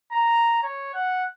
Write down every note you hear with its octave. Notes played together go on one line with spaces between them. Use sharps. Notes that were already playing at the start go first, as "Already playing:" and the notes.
A#5
C#5
F#5